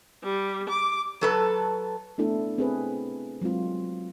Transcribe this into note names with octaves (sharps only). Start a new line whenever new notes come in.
G3
D6
F#3 A4 B4
A3 B3 D4 E4 A4
C4 G#4 B4
F#3 G#3 C4 F4